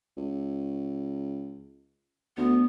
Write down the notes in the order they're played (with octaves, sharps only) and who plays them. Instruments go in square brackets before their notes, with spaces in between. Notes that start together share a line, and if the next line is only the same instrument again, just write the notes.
[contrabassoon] C#2
[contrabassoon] D2 [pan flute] B3